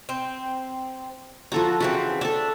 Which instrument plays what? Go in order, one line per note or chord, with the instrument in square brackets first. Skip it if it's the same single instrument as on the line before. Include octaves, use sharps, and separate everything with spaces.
[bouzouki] C4
[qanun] F3 A4 A#5 [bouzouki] F#4
[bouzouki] C#3 E3 C4 [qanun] F#4
[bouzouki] D4 [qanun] A4 E5